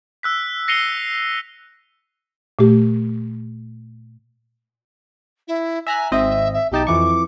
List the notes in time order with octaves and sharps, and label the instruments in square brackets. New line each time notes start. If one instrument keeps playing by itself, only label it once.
[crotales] E6 F#6 B6
A#6 C7 C#7 D#7 F7 G7
[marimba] A#2 A3 G4
[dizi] E4
[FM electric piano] E5 A#5 F#6 [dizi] G#5
[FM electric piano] G#1 C4 D#5 [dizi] E5
[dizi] E5
[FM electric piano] B1 D#4 A5 [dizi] G4
[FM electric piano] F2 E3 C#6 [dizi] D6